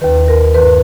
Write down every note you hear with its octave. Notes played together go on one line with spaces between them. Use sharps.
D#2 D#3 B4
A#4
G2 D#3 B4